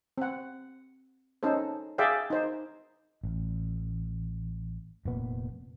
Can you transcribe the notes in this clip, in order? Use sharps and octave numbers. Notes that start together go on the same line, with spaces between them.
C4 F#5
C#4 D#4 A4 C5
G#4 D5 E5 F5 G5
D#4 C5
A1
F1 A#2 B3